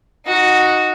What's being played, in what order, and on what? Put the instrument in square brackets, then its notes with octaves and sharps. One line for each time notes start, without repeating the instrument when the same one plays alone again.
[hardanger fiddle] D#4 F#4